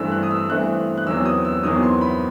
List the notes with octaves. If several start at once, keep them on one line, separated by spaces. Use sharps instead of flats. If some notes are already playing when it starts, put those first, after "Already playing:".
Already playing: G2 E3 A3 C4 E6
F#6
D#6
E6
G2 E3 A3 C4 F#6
F#6
E2 D#3 F#3 C4 E6
D#6
E6
E2 D#3 F#3 C4 D#6
C6
B5